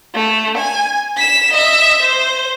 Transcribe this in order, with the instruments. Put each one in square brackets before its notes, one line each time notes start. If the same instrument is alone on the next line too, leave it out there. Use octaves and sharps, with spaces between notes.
[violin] A3
G#5
B6 E7
D#5 E5
C5